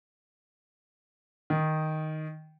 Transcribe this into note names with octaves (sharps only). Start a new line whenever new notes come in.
D#3